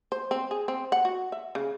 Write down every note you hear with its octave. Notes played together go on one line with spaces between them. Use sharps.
C5
C4
G#4
C4
F#5
F#4
E5
C#3